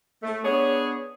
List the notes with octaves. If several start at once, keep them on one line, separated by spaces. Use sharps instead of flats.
A3
B3 D4 G#4 C#5